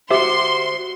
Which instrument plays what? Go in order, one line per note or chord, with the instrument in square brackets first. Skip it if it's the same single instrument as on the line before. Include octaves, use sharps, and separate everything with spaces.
[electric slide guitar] F#4 C5 [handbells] G4 E5 [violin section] C6